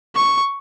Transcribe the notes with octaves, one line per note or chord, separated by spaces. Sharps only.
C#6